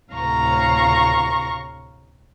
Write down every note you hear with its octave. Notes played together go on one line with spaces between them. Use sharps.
D2 A2 C3 F5 A#5 C#6